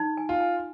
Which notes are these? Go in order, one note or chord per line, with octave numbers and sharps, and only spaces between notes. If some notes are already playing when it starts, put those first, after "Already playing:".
Already playing: D#4
G#5
F4
G#5